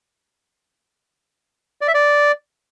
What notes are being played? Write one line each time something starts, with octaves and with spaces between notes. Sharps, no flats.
D5
E5
D5